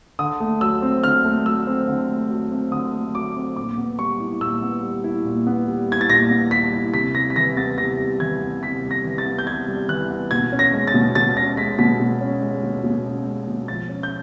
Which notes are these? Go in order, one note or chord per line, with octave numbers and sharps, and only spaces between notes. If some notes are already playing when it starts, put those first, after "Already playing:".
D3 D#6
A3
F#3 E6
C4
D3 F6
A3
F#3 E6
C4
D3
A3
F#3
C4
D3 D#6
A3
F#3 D6
C4
A#2 D6
B3
G3 C#6
E4
A#2 E6
B3
G3
E4
A#2
B3
G3
E4 G#6
A6
A#2 A#6
B3
G3 B6
E4
C3 B6
G3 A#6
B6
E3 A#6
B3 A6
C3 A#6
G3
E3 G#6
B3
C3 B6
G3
A#6
E3
A6
B3
G6
C3 G#6
G3
E3 F#6
B3
B2 G#6
C#4
A#6
G#3
A6
B2
B2 A6
C#4 A#6
G#3 B6
B2 B6
B2
C#4
G#3
B2
B2
C#4
G#3
B2
F3 A6
C#4
G6